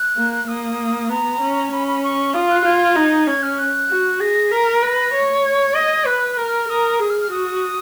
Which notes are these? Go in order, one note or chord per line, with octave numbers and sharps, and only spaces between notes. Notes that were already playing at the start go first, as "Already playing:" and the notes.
Already playing: F#6
A#3
A#3 D#6
B3 A#5
C#4
C#4 B5
B5
C#6
F4 D#6
F#6
F4 G#6
D#4
C#4 G#6
F6
F#6
F#4
G#4 A#6
A#4 B6
B4 A#6
C#5
G#6
D#5
B4 F#6
A#4 F6
A#4 D#6
G#4 D#6
F6
F6
F#4 D#6